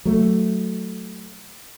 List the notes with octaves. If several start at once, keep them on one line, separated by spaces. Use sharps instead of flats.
F#3 A3